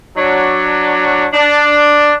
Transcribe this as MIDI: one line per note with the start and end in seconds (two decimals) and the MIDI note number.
0.17 1.26 54
0.17 1.26 62
1.33 2.13 62